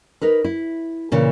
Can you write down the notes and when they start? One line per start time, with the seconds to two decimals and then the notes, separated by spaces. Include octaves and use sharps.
0.21 D#4 A#4 B4
0.44 E4
1.12 A#2 C#3 E3